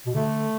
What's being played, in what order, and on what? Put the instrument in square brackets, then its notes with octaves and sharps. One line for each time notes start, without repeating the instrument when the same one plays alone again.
[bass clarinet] B2
[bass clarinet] D3 [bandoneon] A3